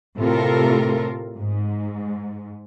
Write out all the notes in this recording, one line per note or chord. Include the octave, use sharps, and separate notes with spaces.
A2 C3 F4 A4 A#4
G#2